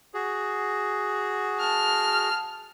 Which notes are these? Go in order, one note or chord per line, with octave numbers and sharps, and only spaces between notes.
F#4 G#4
A5 F6